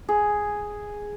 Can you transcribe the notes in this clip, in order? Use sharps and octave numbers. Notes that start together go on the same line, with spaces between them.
G#4